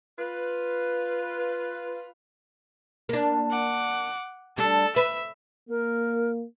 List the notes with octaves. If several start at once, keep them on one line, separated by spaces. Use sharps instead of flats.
F4 B4
A#3 D4
F#5 D6
G3 D4 A4
B4 E5
A#3 A#4